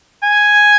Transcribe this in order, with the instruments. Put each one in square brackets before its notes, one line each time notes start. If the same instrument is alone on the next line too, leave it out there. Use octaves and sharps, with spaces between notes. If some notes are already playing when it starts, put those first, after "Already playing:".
[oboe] G#5